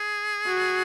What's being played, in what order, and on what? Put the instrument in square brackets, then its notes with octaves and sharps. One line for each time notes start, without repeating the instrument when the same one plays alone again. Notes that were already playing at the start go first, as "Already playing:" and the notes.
Already playing: [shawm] G#4
[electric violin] F#4